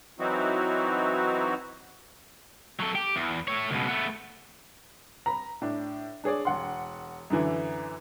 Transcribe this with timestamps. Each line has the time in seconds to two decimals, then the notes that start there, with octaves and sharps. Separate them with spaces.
0.19 E3 F#3 C4 D#4 E4 F#4
2.79 F#3 A4
2.95 G4
3.16 E2
3.48 A3 C#5
3.71 C#2 B2
3.88 A3 B3
5.26 A#5 B5
5.62 A2 D4
6.24 D4 G#4 C#5 D5
6.45 E1 F#5 C6
7.30 F#2 D3 E3 G#5